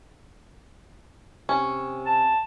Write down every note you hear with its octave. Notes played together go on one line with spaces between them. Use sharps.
C3 C#4
A5